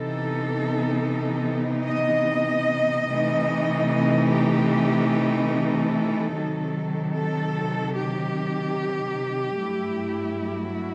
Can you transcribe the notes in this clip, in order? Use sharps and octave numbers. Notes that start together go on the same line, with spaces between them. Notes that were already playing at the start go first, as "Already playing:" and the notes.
Already playing: C3 E3 B3 D#4 A4
D#5
C3 E3 A3 D#4
D#5
G4
A4
C3 D#3 F#3
A4
G4
G2 F#3 A3 E4
F#4